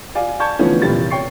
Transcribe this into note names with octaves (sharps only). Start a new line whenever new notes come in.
D5 F5 G#5
D5 A5 C#6 G6 G#6
D3 E3 F3 A3 B3 C#4
F1 A#2 E3 G3 A6
C#5 G5 C#6 C7